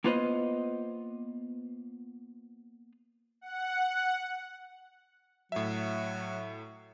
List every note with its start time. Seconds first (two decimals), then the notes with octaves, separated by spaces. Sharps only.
0.04 A#3 B3 F4 B4 C5 D#5
3.41 F#5
5.52 A2 F#3 E5